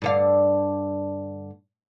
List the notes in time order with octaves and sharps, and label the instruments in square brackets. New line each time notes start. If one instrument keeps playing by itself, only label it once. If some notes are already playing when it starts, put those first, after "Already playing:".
[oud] G2 D3 F5